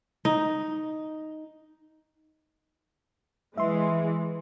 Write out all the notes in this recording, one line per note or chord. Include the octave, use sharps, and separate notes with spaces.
D#4
E3 G#3 E5 C6